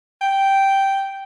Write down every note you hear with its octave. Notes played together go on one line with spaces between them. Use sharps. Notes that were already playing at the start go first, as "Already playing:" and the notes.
G5